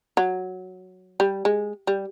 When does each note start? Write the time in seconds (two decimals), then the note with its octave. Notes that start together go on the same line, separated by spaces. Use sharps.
0.17 F#3
1.20 G3
1.45 G#3
1.87 G3